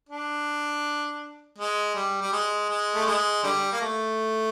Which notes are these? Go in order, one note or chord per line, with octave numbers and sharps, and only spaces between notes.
D4
G#3
G3
G3
G#3
G#3
A3
G#3
D3 G3
A#3
A3